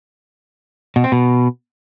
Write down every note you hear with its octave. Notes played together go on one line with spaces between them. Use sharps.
B2
C4
B2